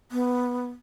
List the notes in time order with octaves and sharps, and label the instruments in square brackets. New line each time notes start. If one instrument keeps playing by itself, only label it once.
[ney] B3